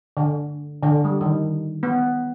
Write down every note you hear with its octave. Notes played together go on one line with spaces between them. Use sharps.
D3
D3
G3
D#3
B3